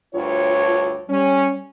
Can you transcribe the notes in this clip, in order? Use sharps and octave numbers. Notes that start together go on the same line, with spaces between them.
D2 G2 F4 C#5
G3 C#4